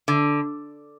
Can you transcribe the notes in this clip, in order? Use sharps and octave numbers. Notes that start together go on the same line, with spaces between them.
D3